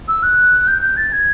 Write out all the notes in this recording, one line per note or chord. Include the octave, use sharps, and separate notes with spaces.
E6
F#6
G6
G6
A6
G#6